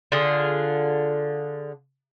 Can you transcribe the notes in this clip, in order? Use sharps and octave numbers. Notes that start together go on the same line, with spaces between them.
D3 F4 G#4